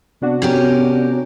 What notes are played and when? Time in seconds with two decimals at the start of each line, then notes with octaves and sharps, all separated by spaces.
0.21 C3 B3 D4 F#4
0.42 B3 C#4 G4 A#4